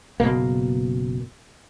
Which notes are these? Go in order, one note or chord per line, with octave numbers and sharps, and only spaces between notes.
F#1 B2 A#3